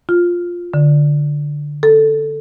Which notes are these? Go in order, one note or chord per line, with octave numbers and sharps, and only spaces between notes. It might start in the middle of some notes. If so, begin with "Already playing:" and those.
F4
D3
A4